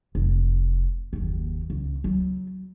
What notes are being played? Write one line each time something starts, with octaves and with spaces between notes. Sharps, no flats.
F1
F#1 D#2
C#2
F#3